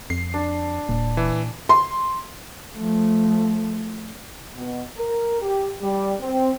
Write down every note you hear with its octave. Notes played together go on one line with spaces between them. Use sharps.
F2 C7
D4
D#1 A#2
E3
C6
F3 A3
B2
A#4
G4
G3
C4